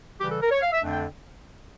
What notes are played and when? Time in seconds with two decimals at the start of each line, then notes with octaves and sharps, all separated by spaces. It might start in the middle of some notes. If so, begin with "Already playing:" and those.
0.19 C#3 E3 G3 G4
0.30 A4
0.41 A#4
0.50 C#5
0.62 F5
0.72 E5
0.83 F2 D3 A3 D4
0.93 G5